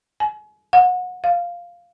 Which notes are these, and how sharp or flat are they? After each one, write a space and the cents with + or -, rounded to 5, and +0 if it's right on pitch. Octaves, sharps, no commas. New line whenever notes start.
G#5 +35
F#5 -30
F5 +0